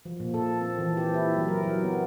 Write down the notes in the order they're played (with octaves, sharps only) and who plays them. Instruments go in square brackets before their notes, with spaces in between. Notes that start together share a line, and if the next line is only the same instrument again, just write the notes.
[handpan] F3
A#2
A4
C4
E3
G4
E4
F#3
A#4
F#3
B3